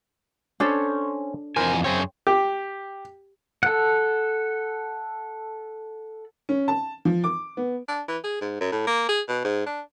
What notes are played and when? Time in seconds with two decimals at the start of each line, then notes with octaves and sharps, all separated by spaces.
0.60 C#4 D4 A4 C5 C#5
1.56 F2 E3 A#4 C5 G#5
1.84 F#2 C4 G#4 C#5
2.27 G4
3.63 A4 F#5
6.49 C#4
6.68 A5
7.05 F3
7.24 D6
7.57 B3
7.88 D4
8.08 E3
8.24 G#4
8.41 G#2
8.61 F#2
8.72 A2
8.87 A#3
9.09 G#4
9.29 B2
9.44 G#2
9.66 D4